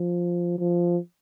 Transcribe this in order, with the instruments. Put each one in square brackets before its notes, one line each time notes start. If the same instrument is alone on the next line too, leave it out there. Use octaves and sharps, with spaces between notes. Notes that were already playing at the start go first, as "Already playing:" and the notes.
Already playing: [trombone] F3
F3